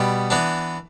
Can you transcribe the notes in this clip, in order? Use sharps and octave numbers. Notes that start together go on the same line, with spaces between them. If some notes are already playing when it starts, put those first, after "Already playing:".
Already playing: B2 G3 B3
E3 B3 D4